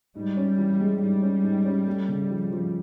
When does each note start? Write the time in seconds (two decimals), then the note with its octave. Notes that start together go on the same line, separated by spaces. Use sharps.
0.15 G#2 G3
0.37 C#4
0.58 E3
0.80 G#3
1.01 G#2 G3
1.22 C#4
1.43 G#2
1.65 C#4
1.86 A3
2.08 C#3
2.30 F3
2.52 F3